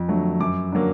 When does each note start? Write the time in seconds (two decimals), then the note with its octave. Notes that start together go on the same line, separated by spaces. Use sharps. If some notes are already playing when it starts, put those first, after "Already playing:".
Already playing: F2
0.08 D3 F#3 A3
0.40 F#2 D6
0.72 D3 F#3 A#3